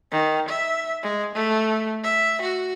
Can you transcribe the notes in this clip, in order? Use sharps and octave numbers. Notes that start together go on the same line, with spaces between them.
D#3
E5
G#3
A3
E5
F#4